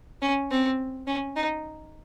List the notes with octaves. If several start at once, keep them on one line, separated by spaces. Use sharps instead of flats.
C#4
C4
C#4
D#4